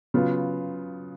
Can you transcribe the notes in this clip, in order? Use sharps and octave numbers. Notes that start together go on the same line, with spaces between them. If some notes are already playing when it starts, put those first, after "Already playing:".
C#3 F#3 B3 F4